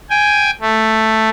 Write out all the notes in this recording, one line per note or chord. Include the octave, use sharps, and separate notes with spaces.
G5 G#5
A3